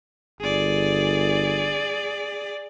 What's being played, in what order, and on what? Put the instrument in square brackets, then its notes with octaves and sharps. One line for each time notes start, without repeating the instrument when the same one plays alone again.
[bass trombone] G1 [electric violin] G#4 D5